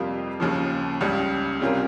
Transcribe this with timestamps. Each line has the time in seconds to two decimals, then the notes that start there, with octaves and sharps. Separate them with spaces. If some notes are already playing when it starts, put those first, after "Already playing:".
Already playing: F2 C3 G3 A#3 F4
0.40 D#2 C#3 F3
1.01 C#2 C#3 G3
1.61 C3 G3 C#4 F4 A#4